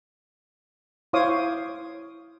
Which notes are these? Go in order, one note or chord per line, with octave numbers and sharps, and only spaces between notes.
E4 C5 C#5 F5 D6 D#6